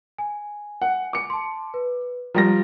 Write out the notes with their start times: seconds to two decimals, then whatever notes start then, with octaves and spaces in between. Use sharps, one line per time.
0.18 G#5
0.82 F#5
1.13 D6 C#7
1.30 A5 C6
1.74 B4
2.34 F3 G3 A#5 A#6